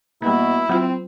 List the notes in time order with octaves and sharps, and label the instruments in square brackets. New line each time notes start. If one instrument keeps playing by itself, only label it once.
[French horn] B2 [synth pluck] G3 A#3 [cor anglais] E4
[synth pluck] F#3 F4 [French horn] C4